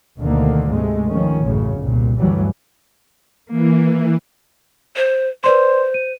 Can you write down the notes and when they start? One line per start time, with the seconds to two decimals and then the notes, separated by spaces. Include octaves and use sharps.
0.18 D2 B2 D3 D#3 A#3
0.71 G#2 C3 G#3 A3
1.08 D#3 F3 C#4
1.43 A1 F#2 A2 C#3
1.77 G1 C2 A#2
2.19 D2 G2 E3 F#3 G3
3.50 E3 A#3
4.96 C5
5.44 B4 C5 D5 C6
5.94 D#7